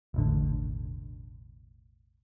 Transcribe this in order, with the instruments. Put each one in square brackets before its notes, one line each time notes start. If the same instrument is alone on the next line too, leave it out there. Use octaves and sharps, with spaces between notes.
[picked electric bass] E1 A1 D3